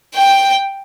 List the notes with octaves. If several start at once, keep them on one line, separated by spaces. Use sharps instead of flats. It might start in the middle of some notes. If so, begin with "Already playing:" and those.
G5